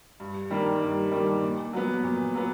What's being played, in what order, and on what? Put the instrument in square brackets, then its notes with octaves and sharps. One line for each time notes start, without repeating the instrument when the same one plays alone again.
[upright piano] G2
D#3 G3 A#3 D4
G2
D#3 G3 A#3 D4
A#2
F#3 B3
A#2
F#3 B3